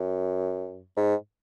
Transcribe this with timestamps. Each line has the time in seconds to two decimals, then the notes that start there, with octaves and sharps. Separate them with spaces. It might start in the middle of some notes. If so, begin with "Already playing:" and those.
Already playing: F#2
0.97 G#2